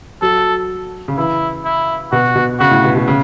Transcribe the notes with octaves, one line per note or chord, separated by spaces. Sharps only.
F#3 A4
C#3
E3 E4
E4
B2 F#4
B2
C#3 F#4
A2
B2
B2
C#3